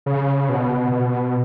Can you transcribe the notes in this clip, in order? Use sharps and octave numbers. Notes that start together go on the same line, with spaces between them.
C#3
B2
B2